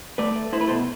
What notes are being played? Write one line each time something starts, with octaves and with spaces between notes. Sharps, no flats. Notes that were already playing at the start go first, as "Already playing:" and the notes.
A3 B4 D5
A3
E4 C5
B4
B2 A4 C5